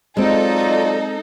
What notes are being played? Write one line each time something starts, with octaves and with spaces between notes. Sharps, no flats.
F#3 G#3 C4 D#4 F4 A4 D5